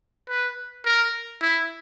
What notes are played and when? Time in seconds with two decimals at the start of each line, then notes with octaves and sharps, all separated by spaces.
0.29 B4
0.86 A#4
1.42 E4